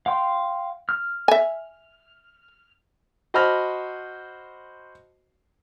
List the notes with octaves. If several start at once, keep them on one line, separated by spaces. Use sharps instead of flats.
F5 G5 C6
F6
E5 G#5
F#4 C5 D#5 A5 B5 F6